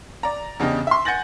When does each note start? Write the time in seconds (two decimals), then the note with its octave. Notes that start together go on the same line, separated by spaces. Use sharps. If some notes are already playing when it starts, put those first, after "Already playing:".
0.23 D5 A#5
0.60 E2 C#3 D4 G4 D#5
0.87 E5 C6
1.05 F#5 G#5 G6 A6 A#6 F#7